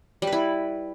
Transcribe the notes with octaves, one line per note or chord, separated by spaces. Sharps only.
G3
B4
E4